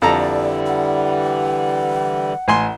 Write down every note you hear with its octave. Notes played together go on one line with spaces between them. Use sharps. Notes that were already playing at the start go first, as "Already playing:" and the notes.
F2 D3 E3 G3 A4 D5 A#5
F#5
A1 G#5 C6